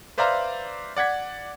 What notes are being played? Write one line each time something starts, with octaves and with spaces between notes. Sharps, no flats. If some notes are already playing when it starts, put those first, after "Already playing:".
B4 C5 D5 E5 F5 A#5
D5 F#5 G#6 B6